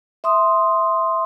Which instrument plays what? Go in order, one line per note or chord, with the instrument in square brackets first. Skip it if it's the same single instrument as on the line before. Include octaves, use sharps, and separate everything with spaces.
[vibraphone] E5 C6 D#6